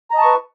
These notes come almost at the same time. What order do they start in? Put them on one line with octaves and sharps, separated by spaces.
A#5 D#5 A5 C#6 B4